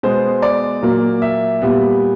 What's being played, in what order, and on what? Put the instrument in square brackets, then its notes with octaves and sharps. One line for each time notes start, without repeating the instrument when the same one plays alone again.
[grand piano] B2 G#3 B3 C5
D5
A#2 F#3 A#3
E5
A#2 G3 B3